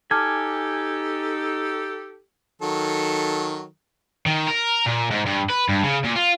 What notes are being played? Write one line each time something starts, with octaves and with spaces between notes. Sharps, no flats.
D#4 G4 A4 G#5 A5 D6 F6
D#3 F#3 A4
D#3
A#4
A#2
G#2
G2
B4
G2
C#3
A#2
F4